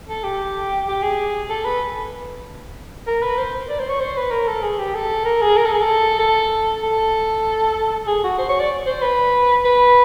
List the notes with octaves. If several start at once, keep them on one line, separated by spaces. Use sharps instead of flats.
A4
G4
G4
G#4
A4
B4
A#4
B4
C5
D5
C5
C#5
C5
B4
A#4
A4
G#4
G4
A4
A#4
G#4
A#4
A4
G#4
A4
A4
A4
G#4
F#4
C5
C#5
D5
C5
B4
B4